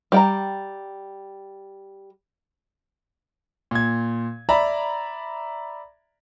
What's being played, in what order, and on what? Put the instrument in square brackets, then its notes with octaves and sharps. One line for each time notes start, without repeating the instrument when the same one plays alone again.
[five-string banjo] G3 G5 A#5
[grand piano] A#2 G#6
D5 E5 A#5 B5